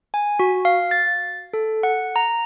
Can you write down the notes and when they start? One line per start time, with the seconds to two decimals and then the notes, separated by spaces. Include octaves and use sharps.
0.14 G#5
0.40 F#4
0.65 F5
0.91 A6
1.54 A4
1.83 F#5
2.16 A#5